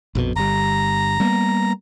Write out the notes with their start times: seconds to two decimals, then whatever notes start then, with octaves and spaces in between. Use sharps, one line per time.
0.15 A#1 F2 B2
0.36 G1 G3 A#5
1.20 G3 A#3 B3